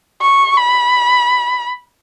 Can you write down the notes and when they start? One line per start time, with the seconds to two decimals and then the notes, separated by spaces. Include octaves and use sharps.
0.21 C#6
0.57 B5